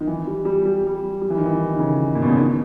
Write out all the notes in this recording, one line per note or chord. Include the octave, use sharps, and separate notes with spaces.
D#3
E3
G3
G3
G3
G3
G3
E3
D#3
E3
D#3
C#3
A#2
B2
C#3
D#3